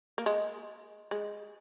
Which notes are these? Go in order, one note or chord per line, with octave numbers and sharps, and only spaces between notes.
A#3
G#3
G#3